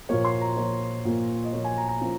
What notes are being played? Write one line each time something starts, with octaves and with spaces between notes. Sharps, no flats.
A#2 F3 A#3 C#5
C6
A#5
A#2 F3 A#3 C#5
A#2 F3 A#3
D#5
A#2 F3 A#3 C#5
G#5
A#5
A#5
F3 A#3 C#4 F4